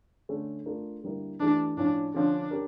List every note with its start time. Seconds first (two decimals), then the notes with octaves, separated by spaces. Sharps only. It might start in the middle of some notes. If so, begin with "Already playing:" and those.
0.29 D3 A3 C#4
0.66 A3 D4 F4 A#4
1.03 D3 G3 A#3 E4 A#4
1.40 E3 A3 D4 E4 G4
1.77 A2 F3 C#4 D4
2.14 D3 F3 C#4 D4
2.51 C#4 G4 A#4